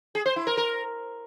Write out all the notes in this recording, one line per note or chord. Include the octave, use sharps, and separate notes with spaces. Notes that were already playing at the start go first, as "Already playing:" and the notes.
G#4
C5
E4
A#4
A#4